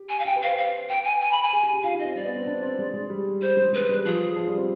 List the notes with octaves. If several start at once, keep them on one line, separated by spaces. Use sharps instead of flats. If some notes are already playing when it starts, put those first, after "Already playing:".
Already playing: G4
G#5
F5
G4 G5
B4
C5 F5
C5 F5
B4 G5
G#5
G#5
B5
G#5
G#4
G4
G4
F4 F5
D#4
D#5
C4
G3 D5
B3
C4
D4
C4
G#3
G#3
G3
G3 C5
G#3
G#3 B4
G3
F3 G#4
F3
G3
C4